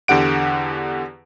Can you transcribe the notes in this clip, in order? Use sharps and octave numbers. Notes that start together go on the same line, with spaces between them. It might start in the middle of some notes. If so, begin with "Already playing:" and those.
E2 D3 G4 F#5 D7